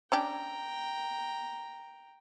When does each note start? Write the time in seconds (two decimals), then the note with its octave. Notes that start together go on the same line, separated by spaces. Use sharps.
0.12 C#4 D4 G4 G5 A#5